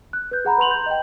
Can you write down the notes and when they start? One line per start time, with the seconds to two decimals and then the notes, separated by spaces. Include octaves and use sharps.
0.13 F#6
0.31 B4 G6
0.45 G#4 F#5 A#5 B5
0.58 B4 B5 C6 F7 F#7
0.71 G6
0.86 D#5 G5